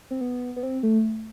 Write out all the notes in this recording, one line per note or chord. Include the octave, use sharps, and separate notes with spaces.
C4
B3
B3
C4
A3